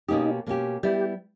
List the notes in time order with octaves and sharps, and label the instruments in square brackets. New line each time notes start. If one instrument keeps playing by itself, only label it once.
[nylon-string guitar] B2 A#3 C#4 G4 [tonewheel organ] D#4
[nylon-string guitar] B2 A#3 C#4 G4
[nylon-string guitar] G3 B3 E4 [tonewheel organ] G4